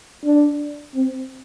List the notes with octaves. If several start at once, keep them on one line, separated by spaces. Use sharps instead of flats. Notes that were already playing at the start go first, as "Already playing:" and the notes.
D4
C4